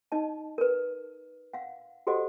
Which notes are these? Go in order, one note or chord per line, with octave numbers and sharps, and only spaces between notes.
D#4 D#5 A5
A#4 B4
F5 F#5
F#4 G4 A4 C5 D#5 F#5